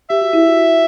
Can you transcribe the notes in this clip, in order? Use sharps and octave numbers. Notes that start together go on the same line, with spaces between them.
G4 E5
F#4
E4
F#4